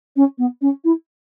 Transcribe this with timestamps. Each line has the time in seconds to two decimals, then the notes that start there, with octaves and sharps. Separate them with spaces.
0.16 C#4
0.38 B3
0.61 C#4
0.84 E4